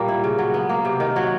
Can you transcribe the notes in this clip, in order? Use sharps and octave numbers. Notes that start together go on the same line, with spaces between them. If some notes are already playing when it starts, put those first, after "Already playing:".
Already playing: A#2 G3 A#3
E4
C#3
F#3
B3
A#3
C3
D#3
F#3